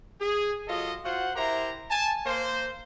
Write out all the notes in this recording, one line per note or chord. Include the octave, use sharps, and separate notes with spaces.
G#4
F#3 F4 A4 D#5
F4 F#4 C5 F#5
E4 G4 A#4 C5 A#5
G#5 A5
A#3 C5